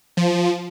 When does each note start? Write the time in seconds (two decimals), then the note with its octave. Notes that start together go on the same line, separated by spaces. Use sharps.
0.17 F3